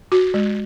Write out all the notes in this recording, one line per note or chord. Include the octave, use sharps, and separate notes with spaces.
F#4
G#3